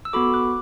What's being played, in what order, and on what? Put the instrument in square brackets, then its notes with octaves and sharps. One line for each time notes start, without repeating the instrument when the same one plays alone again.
[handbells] E6
B3 F#4 A4 B5 D6
D6 F#6